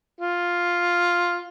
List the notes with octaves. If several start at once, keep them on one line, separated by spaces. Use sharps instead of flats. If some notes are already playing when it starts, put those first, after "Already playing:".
F4